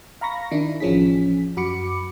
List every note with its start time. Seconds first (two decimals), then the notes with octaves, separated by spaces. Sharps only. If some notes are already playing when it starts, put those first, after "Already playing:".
0.21 F5 A#5 B5 C#6 A#6
0.51 D#3 D4 E4
0.80 A1 F3 C#4 G#4 B6
1.57 F#2 F#4 B5 D6 C#7